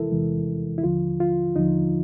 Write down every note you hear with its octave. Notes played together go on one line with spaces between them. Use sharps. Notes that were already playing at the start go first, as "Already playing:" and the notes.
Already playing: E2 C3 E3 G#3 E4 A4 A#4
E2 C3 E3 G#3
E4
D#2 D3 F3 F4
F4
D#2 D3 F3 D#4